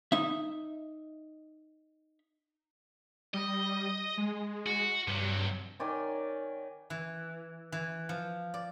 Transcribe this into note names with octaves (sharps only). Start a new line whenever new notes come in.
D#4 E5
G3 D#5
G#3
F#4
G2 C3 F#3
D#3 C#5 D5 G#5
E3
E3
F3
D5